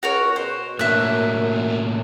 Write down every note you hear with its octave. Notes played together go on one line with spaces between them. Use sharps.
C#2 F#4 A#4 C#5
B2 C5
F#2 A2 A#3 D4 E5 F#6